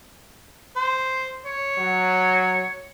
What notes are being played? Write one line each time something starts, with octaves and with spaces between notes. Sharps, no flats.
C5
C#5
F#3